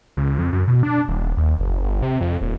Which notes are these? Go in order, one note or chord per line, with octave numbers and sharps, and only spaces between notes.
C#2
F2
F#2
B2
D4
D#1
D#2
F#1
G1
C3
F2
D#1